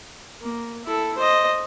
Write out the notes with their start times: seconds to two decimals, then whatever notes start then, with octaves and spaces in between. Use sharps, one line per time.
0.42 A#3
0.85 E4 A4
1.17 C5 D#5